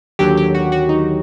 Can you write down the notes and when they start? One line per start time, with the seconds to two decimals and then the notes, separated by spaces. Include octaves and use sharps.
0.19 D#2 D3 F#3 G4
0.38 G4
0.55 F#4
0.72 F#4
0.89 D#4